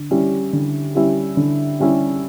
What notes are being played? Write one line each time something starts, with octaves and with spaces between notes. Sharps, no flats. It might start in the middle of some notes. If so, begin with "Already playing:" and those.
Already playing: D3
G3 C#4 E4 G4
D3
G3 C#4 E4 G4
D3
G3 C#4 E4 G4